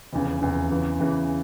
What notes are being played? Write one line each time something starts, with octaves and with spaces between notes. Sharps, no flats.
F1 E2 C#3
F1 E2 C#3
E2 C#3 E3
E2 C#3 E3